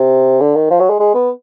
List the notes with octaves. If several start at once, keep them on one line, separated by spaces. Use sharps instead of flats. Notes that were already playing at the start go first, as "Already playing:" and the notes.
Already playing: C3
D3
D#3
F3
F#3
G#3
G#3
B3